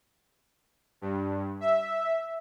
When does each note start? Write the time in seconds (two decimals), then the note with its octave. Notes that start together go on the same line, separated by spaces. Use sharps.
1.01 G2
1.61 E5